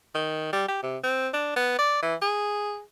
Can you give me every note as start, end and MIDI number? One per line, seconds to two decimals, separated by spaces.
0.15 0.49 51
0.53 0.67 55
0.68 0.80 67
0.83 0.97 48
1.04 1.29 60
1.34 1.55 62
1.56 1.74 59
1.78 2.01 74
2.03 2.15 52
2.22 2.82 68